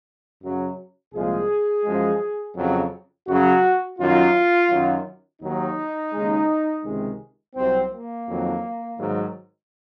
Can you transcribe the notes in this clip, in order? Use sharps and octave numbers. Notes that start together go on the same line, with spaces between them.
F#2 C#3 F#3
C2 A#2 F3 G#3 G#4
F#2 F3 G#3
F2 C#3 F#3
F#2 C#3 F#3 F#4
F#2 D#3 F#3 F4
F#2 D#3 F#3
D#2 D#3 F#3 D#4
D#2 C#3 G#3
C#2 C3 D#3 G#3
C2 C3 F#3 C4
A#3
F2 D#3 F#3
G#2 D#3 F#3